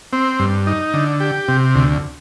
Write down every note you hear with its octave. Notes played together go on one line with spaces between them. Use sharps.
C4
G2
D#4
D3
G4
C3
D2